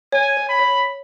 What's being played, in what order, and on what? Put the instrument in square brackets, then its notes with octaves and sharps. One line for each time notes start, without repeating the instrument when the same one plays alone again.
[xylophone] C#5 [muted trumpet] G#5
[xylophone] C#5
[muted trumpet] B5
[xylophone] C#5